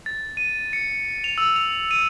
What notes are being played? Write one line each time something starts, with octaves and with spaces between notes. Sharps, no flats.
A6
D#7
C#7
F7
E6
F7
D#7